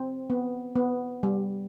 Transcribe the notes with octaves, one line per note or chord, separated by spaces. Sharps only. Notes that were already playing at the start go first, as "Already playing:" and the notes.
Already playing: C4
B3
B3
G3